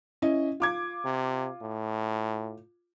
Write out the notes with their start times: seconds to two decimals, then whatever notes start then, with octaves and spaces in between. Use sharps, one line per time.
0.22 C#4 E4 D#5
0.60 F4 D6 G#6
1.04 C3
1.61 A2